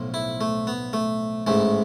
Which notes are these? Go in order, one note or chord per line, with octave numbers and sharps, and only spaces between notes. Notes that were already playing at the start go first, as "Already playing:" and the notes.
Already playing: B1 A2 F3
E4
A3
B3
A3
A1 G#2 E3 A3